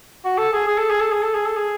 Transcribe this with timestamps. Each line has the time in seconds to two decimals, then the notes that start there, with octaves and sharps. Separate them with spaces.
0.25 F#4
0.38 A4
0.53 G#4
0.67 G#4
0.78 A4
0.90 G#4
1.01 A4
1.12 G#4
1.23 A4
1.35 G#4
1.46 A4
1.57 G#4